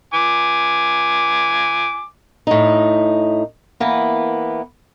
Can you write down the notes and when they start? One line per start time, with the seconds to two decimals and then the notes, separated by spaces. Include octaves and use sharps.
0.14 G#5 D6
2.47 A2 D#4
3.80 E3 A#3 B3